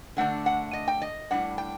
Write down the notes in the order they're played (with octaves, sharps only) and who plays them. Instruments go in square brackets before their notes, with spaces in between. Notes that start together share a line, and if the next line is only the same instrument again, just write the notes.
[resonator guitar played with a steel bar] D3 A3 D4 F#5
F#5
D#5
G5
D#5
A2 G3 D4 F#5
G5